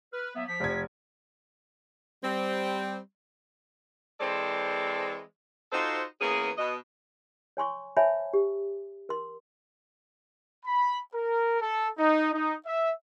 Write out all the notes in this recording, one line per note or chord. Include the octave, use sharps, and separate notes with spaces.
B4 F6
F#3 A#3 B3 E5
F3 B6
F1 G#6
G3 C4
E3 G#3 C4 A4 C5 D5
D#4 F4 F#4 A4 C5
E3 A#3 B3 C#4 G#4
B2 D#5
C#5 G#5 C6 C#6
C5 C#5 E5 G#5 A5 B5
G4
A#4 C6
B5
A#4
A4
D#4
D#4
E5